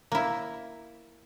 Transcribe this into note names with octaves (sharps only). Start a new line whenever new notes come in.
A#3 E4